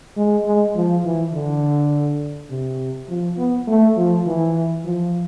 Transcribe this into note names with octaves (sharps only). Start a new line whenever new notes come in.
G#3
G#3
F3
E3
D3
C3
F3
B3
A3
F3
E3
F3